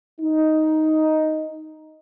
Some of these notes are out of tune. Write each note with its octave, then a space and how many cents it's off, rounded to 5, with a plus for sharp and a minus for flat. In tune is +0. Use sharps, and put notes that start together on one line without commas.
D#4 +5